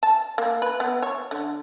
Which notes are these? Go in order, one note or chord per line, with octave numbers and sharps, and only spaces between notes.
A5
A#3
B4
B3
C#5
D3